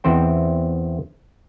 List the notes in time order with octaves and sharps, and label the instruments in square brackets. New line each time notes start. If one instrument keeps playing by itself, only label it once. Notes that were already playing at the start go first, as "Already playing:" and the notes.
[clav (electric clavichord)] E2 E3 C4 C5 G5